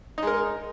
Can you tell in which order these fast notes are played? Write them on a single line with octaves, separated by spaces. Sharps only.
D#4 G#3 A#4